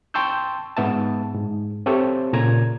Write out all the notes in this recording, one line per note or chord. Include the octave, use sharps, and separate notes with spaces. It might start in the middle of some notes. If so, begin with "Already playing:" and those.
G5 A5 C6 C#6 E6 G6
G#2 B3 E5 A5
G#2
C4 G4 A4 C5 C#5 E5
A#2 C#3 A#5 G#6